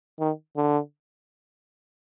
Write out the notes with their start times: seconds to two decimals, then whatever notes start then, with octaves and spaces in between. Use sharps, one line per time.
0.20 D#3
0.56 D3